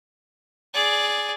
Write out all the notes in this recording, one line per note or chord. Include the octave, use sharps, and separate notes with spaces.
G#4 D5